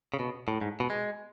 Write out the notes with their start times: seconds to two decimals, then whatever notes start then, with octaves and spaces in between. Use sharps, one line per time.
0.14 C#3
0.19 B2
0.48 A2
0.61 G#2
0.80 B2
0.90 G#3